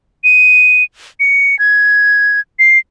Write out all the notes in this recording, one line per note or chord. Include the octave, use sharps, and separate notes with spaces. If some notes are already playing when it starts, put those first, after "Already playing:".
D#7
C#7
G#6
C7